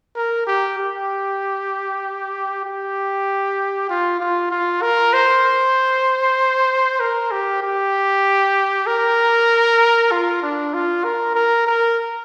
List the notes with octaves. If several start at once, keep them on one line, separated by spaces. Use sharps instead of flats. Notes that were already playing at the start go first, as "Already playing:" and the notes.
A#4
G4
G4
G4
F4
F4
F4
A#4
C5
A#4
G4
G4
A#4
F4
D4
F4
A#4
A#4
A#4